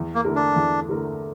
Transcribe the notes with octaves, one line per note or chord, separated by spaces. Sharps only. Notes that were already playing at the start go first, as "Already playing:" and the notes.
Already playing: E2
A#3
D3 A3 E4 A#4
D4
E2
D3 A3 E4 A#4